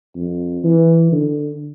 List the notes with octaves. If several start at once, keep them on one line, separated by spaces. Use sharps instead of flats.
F2
E3
D3